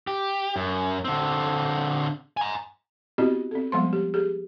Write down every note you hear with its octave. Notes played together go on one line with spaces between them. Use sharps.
G4
F#2
D3 C4
G#5 A#5
B3 C4 E4 F#4 G4 D#5
C4 A4
F3 G3 G#3 B3 C5 C6
G4
G4 G#4